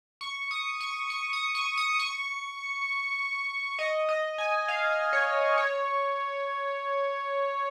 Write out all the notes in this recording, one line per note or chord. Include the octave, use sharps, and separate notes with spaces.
C#6
D#6
C#6
C#6
D#6
C#6
D#6
C#6
D#5
D#5
G#5
F5
C#5
C#5